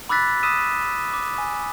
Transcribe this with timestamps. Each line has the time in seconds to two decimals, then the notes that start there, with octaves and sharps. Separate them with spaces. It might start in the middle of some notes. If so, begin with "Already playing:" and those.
0.09 B5 D6 E6 F#6 A6 B6
0.43 D#6 E6 F#6 B6 D#7 E7
1.14 D6
1.38 G#5